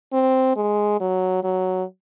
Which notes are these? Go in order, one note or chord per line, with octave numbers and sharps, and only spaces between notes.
C4
G#3
F#3
F#3